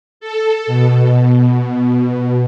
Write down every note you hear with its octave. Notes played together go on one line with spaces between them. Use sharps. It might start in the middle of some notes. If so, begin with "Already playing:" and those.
A4
B2